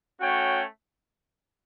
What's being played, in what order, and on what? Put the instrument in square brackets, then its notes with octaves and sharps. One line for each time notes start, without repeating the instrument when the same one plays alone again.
[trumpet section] A3 C#4 F#4 C#5 G5